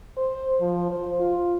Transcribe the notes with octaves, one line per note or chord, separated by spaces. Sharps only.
C5
F3
C5
F4